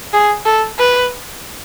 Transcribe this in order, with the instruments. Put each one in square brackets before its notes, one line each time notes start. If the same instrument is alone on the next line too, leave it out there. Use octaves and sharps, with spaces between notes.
[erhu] G#4
A4
B4